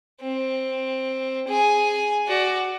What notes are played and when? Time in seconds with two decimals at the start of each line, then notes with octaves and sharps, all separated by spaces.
0.21 C4
1.48 G#4 G#5
2.28 F#4 D5